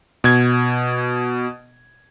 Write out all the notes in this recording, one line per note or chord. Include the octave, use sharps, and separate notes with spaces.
B2 G#6